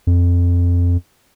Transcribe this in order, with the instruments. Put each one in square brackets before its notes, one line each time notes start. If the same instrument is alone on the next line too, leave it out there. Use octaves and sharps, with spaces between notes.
[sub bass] F2